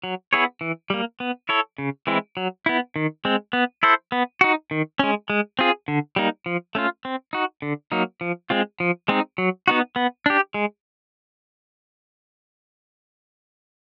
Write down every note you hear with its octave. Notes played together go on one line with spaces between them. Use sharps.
F#3
B3 E4 G#4 C#5
E3
G3 A#3
B3
E4 A4 C#5
C#3
E3 G#3 C4 E4
F#3
B3 E4
D#3
G#3 C4
B3
E4 A4 C5
B3
D#4 F#4
D#3
G#3 C#4
G#3
C4 F4 G#4
D3
G3 A#3 D#4
F3
A3 C#4 F4
C4
D#4 F#4
D3
F#3 A#3 D#4
F3
G#3 C4 F4
F3
G#3 C4 D#4
F#3
B3 D#4 F#4
B3
D4 G4
G#3